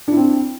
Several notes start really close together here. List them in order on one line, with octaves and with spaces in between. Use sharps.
D4 E4 C4